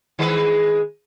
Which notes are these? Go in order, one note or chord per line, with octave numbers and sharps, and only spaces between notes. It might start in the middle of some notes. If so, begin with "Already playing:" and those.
D#3 G#3 B4